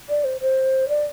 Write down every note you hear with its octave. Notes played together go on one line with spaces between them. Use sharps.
D5
C5
C5
D5